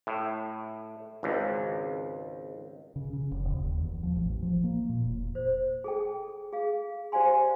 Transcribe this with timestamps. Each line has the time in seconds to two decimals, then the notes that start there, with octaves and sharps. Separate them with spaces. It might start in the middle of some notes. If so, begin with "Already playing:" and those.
0.07 A2
1.23 G#1 C#2
2.96 C#3
3.13 C#3
3.31 F1
3.44 D#1
3.64 D#2
3.83 E2
4.03 F3
4.15 A1
4.42 F3
4.64 A#3
4.89 A#2
5.05 E1
5.35 C5
5.84 G#4 A4 G5
6.53 G#4 F5
7.12 G4 C5 D5 F5 G#5 C6